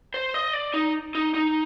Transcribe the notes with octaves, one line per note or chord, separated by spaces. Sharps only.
C5
D#5
D5
D#4
D#4
D#4